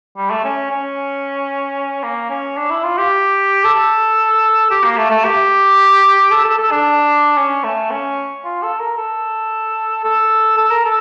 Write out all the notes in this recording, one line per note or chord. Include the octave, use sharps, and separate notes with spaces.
G3
A3
C#4
C#4
A#3
C#4
D4
E4
F4
G4
A4
G4
A#3
A3
A3
G4
A4
A4
A4
D4
C#4
A3
C#4
F4
A4
A#4
A4
A4
A4
A#4
A4